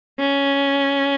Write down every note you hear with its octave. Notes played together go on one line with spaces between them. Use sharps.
C#4